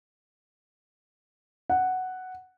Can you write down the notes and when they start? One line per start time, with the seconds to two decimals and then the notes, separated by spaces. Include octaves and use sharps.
1.70 F#5